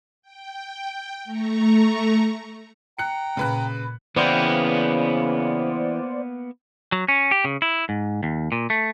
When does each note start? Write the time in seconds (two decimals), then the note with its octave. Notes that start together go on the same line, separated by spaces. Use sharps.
0.22 G5
1.24 A3 A#5 C#6
2.99 G5 A#5 F#6 C#7
3.37 A#2 C#3 B4 F#6
4.16 C#3 E3 A#3 B3 E4 C5 D5 G5
6.92 F#3
7.08 C#4
7.31 G4
7.44 C#3
7.62 E4
7.89 G#2
8.23 D#2
8.52 A#2
8.70 A3